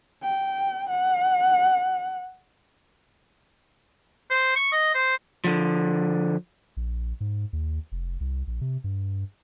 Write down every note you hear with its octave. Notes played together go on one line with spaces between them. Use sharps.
G5
F#5
C5
C#6
D#5
C5
D3 F3
A#1
G#2
D#2
F1
C2
A#1
C3
G2